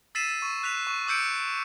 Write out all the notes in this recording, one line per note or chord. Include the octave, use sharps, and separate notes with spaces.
E6 A6 B6 C7 D#7 E7
C#6
F#6 B6 F7
C#6
D6 E6 G6 C#7 D7